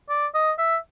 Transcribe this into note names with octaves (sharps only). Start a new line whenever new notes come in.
D5
D#5
E5